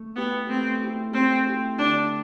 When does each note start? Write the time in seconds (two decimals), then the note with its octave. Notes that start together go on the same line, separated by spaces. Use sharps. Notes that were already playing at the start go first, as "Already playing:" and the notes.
Already playing: A3
0.16 B3 E4 G4
0.49 A3 C4
0.82 E4 G4
1.14 A3 C4
1.47 E4 G4
1.78 D3 D4